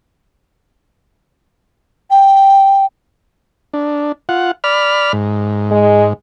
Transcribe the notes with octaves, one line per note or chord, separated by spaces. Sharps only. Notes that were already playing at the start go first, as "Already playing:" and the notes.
G5
D4
F4 F#5
D5 B5 F6
G#2
G#3